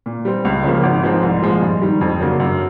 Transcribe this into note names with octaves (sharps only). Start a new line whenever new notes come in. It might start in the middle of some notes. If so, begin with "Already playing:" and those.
A#2
G3 C4
C#2
C#3 F3 A#3
G#1
G#2 F3 G#3 C4
C2
A#2 F3 G#3
G2
D#3 G3
F2
C#3 F#3 A#3 D4
F#2